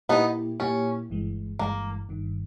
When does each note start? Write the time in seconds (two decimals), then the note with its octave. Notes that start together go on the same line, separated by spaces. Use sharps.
0.09 A#2 A#3 B3 D#4 E4 G4
0.60 A#2 A#3 C#4 E4 G4
1.10 G1 G2 E3 G#3
1.59 G1 G2 E3 G#3 A#3
2.09 G1 G2 D#3